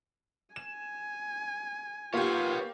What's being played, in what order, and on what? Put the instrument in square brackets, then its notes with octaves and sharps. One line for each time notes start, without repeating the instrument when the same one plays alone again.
[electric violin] G#5 [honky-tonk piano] E7
[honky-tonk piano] A#3 G4 [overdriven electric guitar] B3 C#5 [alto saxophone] F4